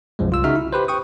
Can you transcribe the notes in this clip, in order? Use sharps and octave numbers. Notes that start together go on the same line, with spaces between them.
B1 F#2 F3 G#3
C2 F4 E6
C#3 D#4 F#4 E5 F6
E4
G4 B4 C5
G5 C#6 D#6